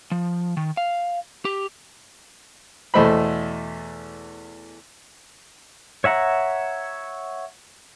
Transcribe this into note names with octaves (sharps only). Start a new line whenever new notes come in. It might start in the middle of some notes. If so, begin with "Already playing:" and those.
F3
D#3
F5
G4
E2 B2 A3 C5 B5
C#5 E5 F#5 A#5